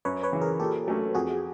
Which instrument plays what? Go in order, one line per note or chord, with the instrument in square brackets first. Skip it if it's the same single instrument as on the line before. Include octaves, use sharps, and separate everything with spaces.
[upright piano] F#2 [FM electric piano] B4 C#5
[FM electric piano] B4 C#5
[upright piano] C#3 E3
[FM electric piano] G#4 A#4
[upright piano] A#2 [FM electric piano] G4 A4
[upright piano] F#3 A3 C#4
[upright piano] F2 [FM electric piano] F#4 G#4